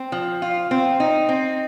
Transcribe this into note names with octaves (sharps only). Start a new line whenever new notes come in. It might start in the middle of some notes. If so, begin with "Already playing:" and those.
Already playing: C4
F3
F4
C4
D#4
C4